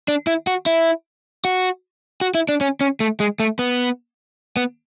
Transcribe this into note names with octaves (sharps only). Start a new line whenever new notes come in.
D4
E4
F#4
E4
F#4
F#4
E4
D4
C#4
C#4
A3
G#3
A3
B3
B3